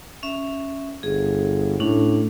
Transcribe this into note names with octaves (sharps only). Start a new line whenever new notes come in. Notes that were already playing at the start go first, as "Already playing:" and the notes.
C#4 E5
G1 G#4
A2 C#4 D4